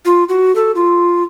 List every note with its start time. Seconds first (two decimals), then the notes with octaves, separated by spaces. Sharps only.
0.05 F4
0.29 F#4
0.55 A4
0.75 F4